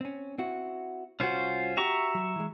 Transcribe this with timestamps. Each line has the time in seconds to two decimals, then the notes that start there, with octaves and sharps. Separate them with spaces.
0.01 C4 C#4
0.38 C4 E4 F#4
1.20 C2 C#4 F4 F#4 C5
1.77 F#4 G4 E5 A#5 C#6
2.15 F#3
2.36 E3 G#3